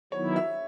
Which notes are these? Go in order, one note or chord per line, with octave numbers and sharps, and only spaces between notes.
D#3 F#3 B3 E4 C#5
E5